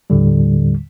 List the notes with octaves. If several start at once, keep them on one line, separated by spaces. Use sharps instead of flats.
D#2 A2 D3 G3